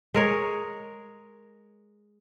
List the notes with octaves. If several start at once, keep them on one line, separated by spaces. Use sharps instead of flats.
G#3 A#4 C#5